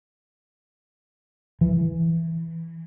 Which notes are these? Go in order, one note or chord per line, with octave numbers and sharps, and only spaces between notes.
E3